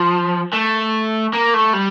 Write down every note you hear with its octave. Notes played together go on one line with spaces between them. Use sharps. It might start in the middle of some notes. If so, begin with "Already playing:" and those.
Already playing: F3
A3
A#3
A3
G3